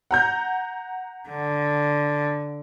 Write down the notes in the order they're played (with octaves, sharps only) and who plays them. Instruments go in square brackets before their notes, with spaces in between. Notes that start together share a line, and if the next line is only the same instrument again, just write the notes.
[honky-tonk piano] F#5 A#5 G6
[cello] D3